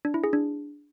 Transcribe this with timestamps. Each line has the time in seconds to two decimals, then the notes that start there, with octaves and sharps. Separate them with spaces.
0.05 D4
0.14 E4
0.24 G#4
0.33 D4